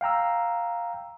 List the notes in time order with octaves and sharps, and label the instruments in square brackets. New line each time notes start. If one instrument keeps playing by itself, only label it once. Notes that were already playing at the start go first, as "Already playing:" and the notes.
[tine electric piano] F5 G5 A#5 E6